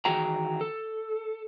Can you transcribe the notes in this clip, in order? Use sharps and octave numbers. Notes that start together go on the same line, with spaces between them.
D#3 E3 F#4 G#4 G5 A#5
A4